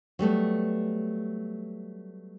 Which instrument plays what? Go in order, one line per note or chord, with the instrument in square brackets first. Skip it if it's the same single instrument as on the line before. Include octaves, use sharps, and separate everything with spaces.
[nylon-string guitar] F#3 G3 A3 B3